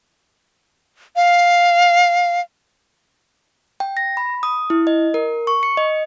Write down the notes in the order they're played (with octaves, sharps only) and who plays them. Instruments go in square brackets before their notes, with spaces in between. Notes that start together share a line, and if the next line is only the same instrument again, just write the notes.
[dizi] F5
[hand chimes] G5
A#6
B5
D#6
E4
D#5
A#4
C#6
C#7
D#5